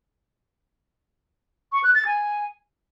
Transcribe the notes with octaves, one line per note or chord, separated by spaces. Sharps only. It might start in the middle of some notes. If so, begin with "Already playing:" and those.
C#6
F#6
A6
G#5